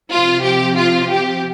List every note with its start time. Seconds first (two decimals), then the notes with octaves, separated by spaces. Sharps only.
0.11 C3 F3 F4
0.43 G4
0.78 F4
1.11 G4